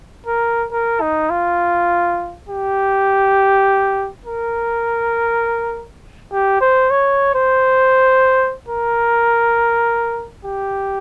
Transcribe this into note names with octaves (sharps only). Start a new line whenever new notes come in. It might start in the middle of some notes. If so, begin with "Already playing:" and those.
A#4
A#4
D#4
F4
G4
A#4
G4
C5
C#5
C5
A#4
G4